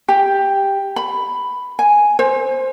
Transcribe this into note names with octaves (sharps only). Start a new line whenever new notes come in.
G4
B5
G#5
C5